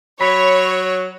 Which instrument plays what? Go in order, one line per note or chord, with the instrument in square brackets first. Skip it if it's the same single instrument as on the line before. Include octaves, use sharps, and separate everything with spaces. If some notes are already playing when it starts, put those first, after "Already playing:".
[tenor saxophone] F#3 [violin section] C#5 [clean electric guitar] B5